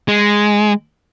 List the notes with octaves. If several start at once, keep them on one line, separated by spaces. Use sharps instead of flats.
G#3